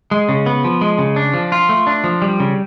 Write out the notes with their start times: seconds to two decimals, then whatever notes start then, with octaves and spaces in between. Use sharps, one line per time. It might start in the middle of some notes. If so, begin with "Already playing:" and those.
0.11 G#3
0.29 C#3
0.46 B3
0.65 F3
0.81 G#3
0.98 C#3
1.16 D4
1.34 F3
1.52 F4
1.69 A3
1.87 D4
2.04 F3
2.22 G3
2.40 C#3